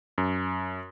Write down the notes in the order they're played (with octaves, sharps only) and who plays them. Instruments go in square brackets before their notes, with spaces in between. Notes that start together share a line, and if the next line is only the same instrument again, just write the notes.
[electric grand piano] F#2